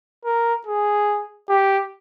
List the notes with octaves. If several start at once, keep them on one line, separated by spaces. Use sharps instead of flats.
A#4
G#4
G4